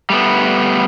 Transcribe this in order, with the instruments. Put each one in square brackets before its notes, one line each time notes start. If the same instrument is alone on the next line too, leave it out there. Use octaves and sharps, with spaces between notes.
[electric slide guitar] G3 A3 B3